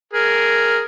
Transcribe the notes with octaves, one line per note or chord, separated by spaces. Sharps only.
G#4 A#4